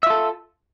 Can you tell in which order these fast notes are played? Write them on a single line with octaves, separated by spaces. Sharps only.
E5 F4 A4